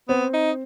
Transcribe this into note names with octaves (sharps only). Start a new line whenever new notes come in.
B3 C4
D#4